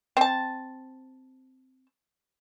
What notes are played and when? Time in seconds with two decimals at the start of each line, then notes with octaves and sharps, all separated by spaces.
0.17 C4 A5